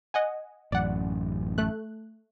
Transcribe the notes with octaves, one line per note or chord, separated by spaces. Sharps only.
D#5 F#5 G#5
A1 F#2 D5 F#5
A3 F#6